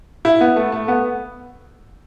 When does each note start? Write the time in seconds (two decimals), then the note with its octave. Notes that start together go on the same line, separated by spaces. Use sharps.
0.25 E4
0.41 B3
0.56 A3
0.72 A3
0.88 B3